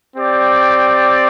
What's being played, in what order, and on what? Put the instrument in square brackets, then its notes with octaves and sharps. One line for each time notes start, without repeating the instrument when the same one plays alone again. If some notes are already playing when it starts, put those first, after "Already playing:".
[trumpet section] C4 G4 D5